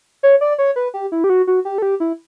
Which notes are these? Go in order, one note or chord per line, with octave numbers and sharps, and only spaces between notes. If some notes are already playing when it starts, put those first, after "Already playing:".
C#5
D5
C#5
B4
G4
E4
G4
F#4
F#4
G4
A4
G4
E4